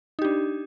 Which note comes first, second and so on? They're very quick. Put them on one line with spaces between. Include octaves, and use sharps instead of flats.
D#4 G4 D4